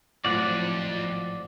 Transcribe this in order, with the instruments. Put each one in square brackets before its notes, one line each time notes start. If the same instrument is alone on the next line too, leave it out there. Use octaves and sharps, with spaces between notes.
[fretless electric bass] G#1 A2 F#3 [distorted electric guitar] F2 [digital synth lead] F3 [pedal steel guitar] D5 F#5